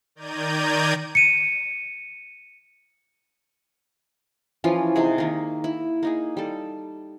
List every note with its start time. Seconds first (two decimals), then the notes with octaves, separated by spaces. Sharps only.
0.15 D#3 D5 A#5 G6 G#6 D#7
1.15 C#7 D#7
4.64 E3 F3 C#4 F4
4.96 C3 D#4 G#4
5.18 D#3 A#3
5.64 E4
6.03 A#3 D#4 G#4
6.37 G3 A4